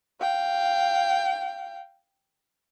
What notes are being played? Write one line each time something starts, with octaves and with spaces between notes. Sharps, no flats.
F5 G5